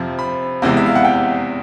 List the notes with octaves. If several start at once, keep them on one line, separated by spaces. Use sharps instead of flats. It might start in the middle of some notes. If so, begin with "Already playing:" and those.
Already playing: F2 C3 F3
B5
E2 C3 E3 G#3
E5
F5
F#5
G5